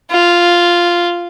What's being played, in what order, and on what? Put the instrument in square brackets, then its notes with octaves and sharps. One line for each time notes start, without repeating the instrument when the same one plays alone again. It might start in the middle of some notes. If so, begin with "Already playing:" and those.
[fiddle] F4